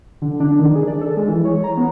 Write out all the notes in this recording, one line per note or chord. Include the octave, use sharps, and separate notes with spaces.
D3
D4
D#3
G#4
D5
A4
G#3
E3
C#5
A#5
B3